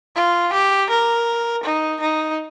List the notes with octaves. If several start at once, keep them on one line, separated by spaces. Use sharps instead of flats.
F4
G4
A#4
D#4
D#4